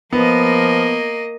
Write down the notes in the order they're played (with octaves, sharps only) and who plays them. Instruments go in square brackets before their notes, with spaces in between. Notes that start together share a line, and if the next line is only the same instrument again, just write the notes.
[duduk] F3 [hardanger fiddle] A#3 D#5 [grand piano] B3